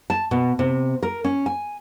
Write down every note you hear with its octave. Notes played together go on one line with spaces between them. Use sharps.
A5
B2
C3
A#4
C#4
G#5